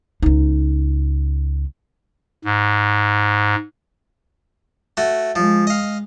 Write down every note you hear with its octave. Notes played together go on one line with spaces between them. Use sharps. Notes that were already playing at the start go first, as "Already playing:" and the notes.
C#2 D#4
G#2
A3 F#4
F3 G#3
D#5 F5